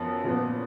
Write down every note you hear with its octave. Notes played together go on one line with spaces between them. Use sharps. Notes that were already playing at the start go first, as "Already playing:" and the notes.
Already playing: F#2 F3 B3
A#2 F3 B3